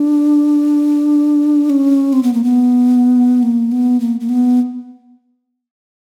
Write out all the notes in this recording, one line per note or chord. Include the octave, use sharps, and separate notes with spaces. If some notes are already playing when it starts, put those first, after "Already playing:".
Already playing: D4
C#4
C4
B3
A#3
B3
A#3
B3
A#3
A#3
B3